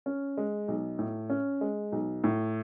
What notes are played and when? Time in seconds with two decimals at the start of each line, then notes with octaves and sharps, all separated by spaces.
0.06 C#4
0.37 G#3
0.68 B1
0.99 A2
1.30 C#4
1.61 G#3
1.92 B1
2.24 A2